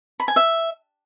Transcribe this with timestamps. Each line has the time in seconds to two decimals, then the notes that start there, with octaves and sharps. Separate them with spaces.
0.20 B5
0.28 G#5
0.36 E5